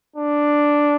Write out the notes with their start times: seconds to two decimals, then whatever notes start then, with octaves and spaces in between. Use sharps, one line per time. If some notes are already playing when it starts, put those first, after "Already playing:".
0.16 D4